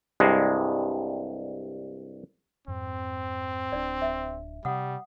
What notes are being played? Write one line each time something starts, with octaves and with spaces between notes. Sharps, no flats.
C2 G2 G#3
F2 G#2 C4
D1 D4 D5
E5
C3 G3 F#5 D#6